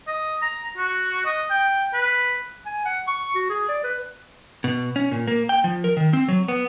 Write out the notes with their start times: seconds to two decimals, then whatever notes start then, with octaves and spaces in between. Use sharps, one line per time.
0.07 D#5
0.42 A#5
0.77 F#4
1.26 D#5
1.51 G5
1.94 B4
2.66 G#5
2.85 F#5
3.07 C#6
3.35 F#4
3.49 G#4
3.69 D5
3.84 B4
4.64 B2
4.96 C#4
5.11 A#2
5.28 A#3
5.49 G5
5.64 F3
5.84 A#4
5.97 D#3
6.13 C4
6.28 F#3
6.48 B3